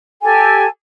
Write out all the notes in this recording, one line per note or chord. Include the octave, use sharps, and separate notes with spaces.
G4 A4 G#5